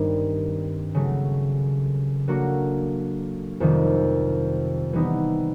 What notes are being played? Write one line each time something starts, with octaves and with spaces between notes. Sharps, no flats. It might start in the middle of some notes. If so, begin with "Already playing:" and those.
Already playing: G2 D#3 G3 C4
C#3 F#3 A3
F#3 A#3 D4 F#4 A4
F2 C3 D#3 G3
E3 G3 B3 D#4